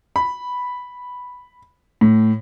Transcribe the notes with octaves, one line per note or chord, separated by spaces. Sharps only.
B5
A2